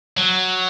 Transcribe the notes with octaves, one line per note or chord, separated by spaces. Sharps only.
F#3